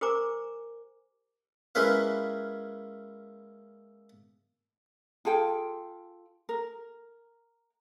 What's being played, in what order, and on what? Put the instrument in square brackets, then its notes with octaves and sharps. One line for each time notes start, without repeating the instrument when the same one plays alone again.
[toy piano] G4 A#4 C5 G#5 A#5 D6
[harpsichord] G#3 A#3 C#4 E4 B4 F5
[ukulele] F4 G#4 A4 G5
A#4